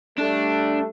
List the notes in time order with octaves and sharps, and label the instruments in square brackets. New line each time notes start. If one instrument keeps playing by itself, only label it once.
[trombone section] G3 A3 [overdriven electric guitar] D4